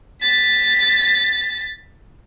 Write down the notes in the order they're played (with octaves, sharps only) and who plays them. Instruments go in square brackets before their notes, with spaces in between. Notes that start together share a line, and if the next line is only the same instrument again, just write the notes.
[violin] A6 B6